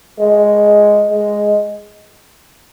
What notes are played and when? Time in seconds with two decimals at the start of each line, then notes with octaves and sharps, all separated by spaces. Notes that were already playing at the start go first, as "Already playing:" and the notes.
0.19 G#3
1.11 G#3